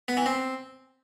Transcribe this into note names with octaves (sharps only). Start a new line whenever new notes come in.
B3
E3
C4